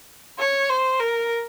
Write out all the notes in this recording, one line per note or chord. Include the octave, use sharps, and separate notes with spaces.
C#5
C5
A#4